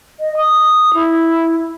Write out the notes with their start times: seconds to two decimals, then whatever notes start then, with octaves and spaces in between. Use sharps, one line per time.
0.20 D#5
0.37 D#6
0.94 E4